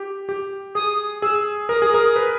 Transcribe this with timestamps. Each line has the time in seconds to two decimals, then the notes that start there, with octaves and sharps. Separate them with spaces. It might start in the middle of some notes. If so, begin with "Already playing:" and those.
Already playing: G4
0.29 G4
0.75 G#4 D#6
1.22 G#4 E6
1.69 A#4 D#6
1.82 G#4
1.94 A#4
2.16 B4